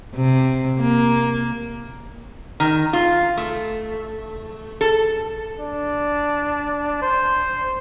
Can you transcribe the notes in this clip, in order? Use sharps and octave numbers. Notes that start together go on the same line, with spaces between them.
C3
A#3
D#3
F4
A3
A4
D4
C5